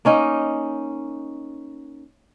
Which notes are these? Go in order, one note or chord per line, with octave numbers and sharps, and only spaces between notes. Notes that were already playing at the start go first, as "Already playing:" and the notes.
A#3 C#4 D#4